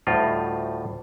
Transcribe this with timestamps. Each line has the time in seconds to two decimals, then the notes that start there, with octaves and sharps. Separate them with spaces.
0.07 D2 A2 G3 D#4 F4 G5